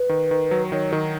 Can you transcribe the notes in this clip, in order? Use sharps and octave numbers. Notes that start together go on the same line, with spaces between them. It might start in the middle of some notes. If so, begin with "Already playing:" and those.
Already playing: B4
D#3
D#3
F#3
D#3 C#5
D#3 D#4